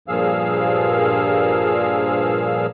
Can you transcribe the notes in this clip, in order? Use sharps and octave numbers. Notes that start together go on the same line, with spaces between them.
G2 A#2 F3 G#4 F5 E6